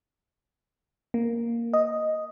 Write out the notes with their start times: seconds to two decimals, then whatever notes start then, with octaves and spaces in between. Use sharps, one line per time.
1.14 A#3
1.73 D#5